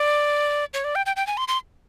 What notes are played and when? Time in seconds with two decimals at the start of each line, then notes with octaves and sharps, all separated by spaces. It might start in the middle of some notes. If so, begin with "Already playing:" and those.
Already playing: D5
0.74 C#5
0.84 D5
0.95 G5
1.06 G5
1.16 G5
1.27 G#5
1.37 C6
1.48 C6